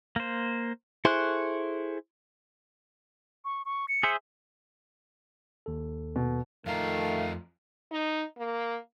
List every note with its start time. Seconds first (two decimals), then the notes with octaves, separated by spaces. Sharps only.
0.16 A#3 C5
1.05 E4 G#4 A4 C5 C#6 F#6
3.45 C#6
3.66 C#6
3.88 C#7
4.03 G#4 C5 E5
5.66 D#2 A4
6.16 B2
6.66 F2 D#3 A3 F4 F5 A#5
7.92 D#4
8.38 A#3